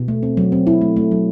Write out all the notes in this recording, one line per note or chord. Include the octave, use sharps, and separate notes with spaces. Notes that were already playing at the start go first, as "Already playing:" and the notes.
Already playing: B2
A3
C4
F#3
C4
E4
A3
A3
F#3